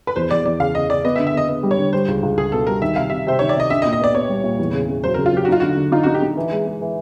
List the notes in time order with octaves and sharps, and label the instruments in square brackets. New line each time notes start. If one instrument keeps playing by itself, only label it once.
[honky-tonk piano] B4
[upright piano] E2 [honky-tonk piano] C5
[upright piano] E2 [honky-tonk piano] D5
[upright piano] E2 [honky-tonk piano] D5
[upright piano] C#3 [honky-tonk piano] F5
[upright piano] C#3 [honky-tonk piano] D#5
[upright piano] C#3 [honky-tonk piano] D5
[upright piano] B3 [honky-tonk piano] D#5
[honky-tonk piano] E5
[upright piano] D3
[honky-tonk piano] E5
[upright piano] B3 [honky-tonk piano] D#5
[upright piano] B3
G3
[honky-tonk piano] C#5
[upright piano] D3
[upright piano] G3 [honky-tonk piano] C5
[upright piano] C#2
C#2
[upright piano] C#2 [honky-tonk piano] G#4
[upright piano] B2 [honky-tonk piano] A4
[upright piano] G3 [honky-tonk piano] A#4
[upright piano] D#3 [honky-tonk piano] E5
[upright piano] C3 [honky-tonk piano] F5
[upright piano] C3 [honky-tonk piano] E5
[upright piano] C3 [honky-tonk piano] C5
[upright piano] D#3 [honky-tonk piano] C#5
[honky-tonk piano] D5
[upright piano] C3 [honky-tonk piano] D#5
[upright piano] D4 [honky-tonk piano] E5
[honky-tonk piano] D#5
[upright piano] A#2
[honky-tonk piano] D#5
[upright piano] B3 [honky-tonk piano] D5
[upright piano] B3 [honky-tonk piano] C#5
[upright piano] G3
A#2
E2
C#3
C#3
[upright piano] F#3 [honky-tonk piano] C5
[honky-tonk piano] A#4
[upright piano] C#3
[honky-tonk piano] F4
[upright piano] F#3 [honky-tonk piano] G4
[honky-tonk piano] F#4
[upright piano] D#4 [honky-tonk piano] F4
[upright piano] D3 [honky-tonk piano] F#4
[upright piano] D3
[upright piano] D#4 [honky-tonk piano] F4
[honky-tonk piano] F#4
[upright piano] D#4
[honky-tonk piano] G4
[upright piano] D#4
E3
G#3
G#3
E3